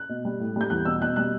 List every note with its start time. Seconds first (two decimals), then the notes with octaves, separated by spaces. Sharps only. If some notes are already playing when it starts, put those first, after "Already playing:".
Already playing: F#6
0.09 B2
0.25 G3
0.40 A2
0.56 G3 G6
0.70 E2 F#6
0.85 B2 E6
1.01 B2 F#6
1.16 G3 F#6